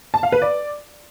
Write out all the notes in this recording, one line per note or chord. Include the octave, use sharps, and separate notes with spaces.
A5
F5
B4
D5